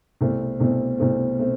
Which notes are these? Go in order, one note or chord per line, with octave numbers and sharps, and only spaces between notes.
C2 B2 A3 C4
C2 B2 A3 C4
C2 B2 A3 C4
B2 A3 C4